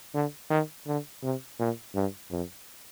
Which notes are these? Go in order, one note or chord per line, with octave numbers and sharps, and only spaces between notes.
D3
D#3
D3
C3
A#2
G2
F2